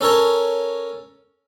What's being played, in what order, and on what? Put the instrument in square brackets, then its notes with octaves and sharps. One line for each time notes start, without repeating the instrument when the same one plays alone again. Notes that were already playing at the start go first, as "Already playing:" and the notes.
[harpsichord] C#4 A4 A#4 C#5